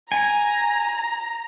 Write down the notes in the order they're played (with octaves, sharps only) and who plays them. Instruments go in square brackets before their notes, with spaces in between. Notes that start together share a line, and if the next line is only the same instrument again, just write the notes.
[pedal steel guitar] G#5 [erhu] A#5